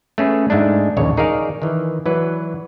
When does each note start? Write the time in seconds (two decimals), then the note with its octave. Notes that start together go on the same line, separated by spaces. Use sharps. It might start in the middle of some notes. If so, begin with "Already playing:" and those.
0.18 A3 C#4 G#4 B4
0.50 G#2 G#3 A3 D4
0.97 A#1 D#2 C#3 C#5
1.17 D#4 G#4 A#4 C#5 D5 F5
1.62 D#3 E3
2.06 E3 F#3 B4 D5